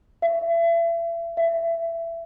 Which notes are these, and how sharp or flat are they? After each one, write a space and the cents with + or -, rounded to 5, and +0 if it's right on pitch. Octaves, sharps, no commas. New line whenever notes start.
E5 +35
E5 +20